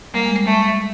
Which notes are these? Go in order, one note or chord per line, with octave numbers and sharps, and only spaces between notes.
G3 A#3
G#3
G3
G#3 A3